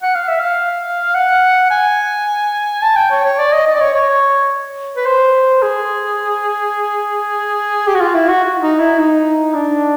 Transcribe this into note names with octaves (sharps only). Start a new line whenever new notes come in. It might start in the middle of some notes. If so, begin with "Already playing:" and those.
F#5
F5
E5
F5
F#5
G#5
A5
G5
C#5
C#5
D5
D#5
D#5
D5
C#5
C#5
B4
C5
G#4
G4
F#4
F4
E4
F#4
D#4
E4
D#4
D4